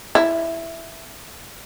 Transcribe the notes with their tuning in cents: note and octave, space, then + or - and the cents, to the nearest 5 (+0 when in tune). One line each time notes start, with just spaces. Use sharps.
E4 +5